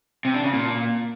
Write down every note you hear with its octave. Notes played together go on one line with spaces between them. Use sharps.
C3
D4
C#3
A#2